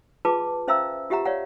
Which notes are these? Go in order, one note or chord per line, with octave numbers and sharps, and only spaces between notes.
F4 G#4 B4 A5 D6
C#4 C5 E5 F5 A#5 E6
F4 G4 E5 F#5 A#5
C#5 D5 F5 F#5